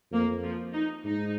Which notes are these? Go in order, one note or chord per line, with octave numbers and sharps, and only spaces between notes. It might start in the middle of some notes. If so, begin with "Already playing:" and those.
F2 A#3
F3
D#4
G#2 D#4